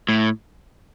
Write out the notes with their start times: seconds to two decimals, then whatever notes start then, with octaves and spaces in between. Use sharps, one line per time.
0.09 A2